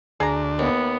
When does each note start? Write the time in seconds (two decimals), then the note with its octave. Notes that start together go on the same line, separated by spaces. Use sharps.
0.20 D2 D4 G#4 A#5
0.59 D#2 B3